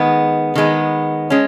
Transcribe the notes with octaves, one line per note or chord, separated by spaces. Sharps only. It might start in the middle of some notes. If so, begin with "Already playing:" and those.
Already playing: D#3 G#3 B3
D#3 G#3 B3
G#3 C#4